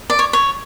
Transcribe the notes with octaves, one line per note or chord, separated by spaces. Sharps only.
D5
C#5
C#5